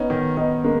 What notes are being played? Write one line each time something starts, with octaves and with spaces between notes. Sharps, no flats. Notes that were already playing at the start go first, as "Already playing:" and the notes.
Already playing: B3 C#4 D#4
D#3
D#3 B3 D#4
G#3 A#3 C#4